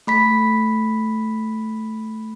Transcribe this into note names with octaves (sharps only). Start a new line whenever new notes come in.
A3 B5 B6